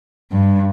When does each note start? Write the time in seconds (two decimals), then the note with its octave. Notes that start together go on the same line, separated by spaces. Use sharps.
0.32 G2